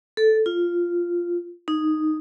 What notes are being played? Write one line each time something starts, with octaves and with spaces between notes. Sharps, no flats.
A4
F4
D#4